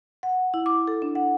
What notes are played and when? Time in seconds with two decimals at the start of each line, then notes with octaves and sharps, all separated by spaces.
0.23 F#5
0.54 E4
0.66 D6
0.88 A4
1.02 D4
1.15 F#5